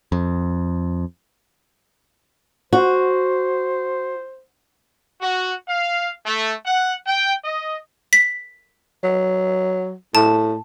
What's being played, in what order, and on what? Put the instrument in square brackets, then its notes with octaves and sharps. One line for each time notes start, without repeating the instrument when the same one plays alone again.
[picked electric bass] F2
[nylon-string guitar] F#4 [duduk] C5
[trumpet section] F#4
F5
A3
F#5
G5
D#5
[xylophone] B6
[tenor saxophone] F#3
[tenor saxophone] A2 [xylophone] A5